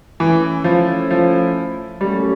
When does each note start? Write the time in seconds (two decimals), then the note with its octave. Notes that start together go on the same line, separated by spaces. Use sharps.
0.19 E3 A3 C#4 E4
0.64 F3
1.11 F3
2.01 A#2 F#3 G3 A3 C#4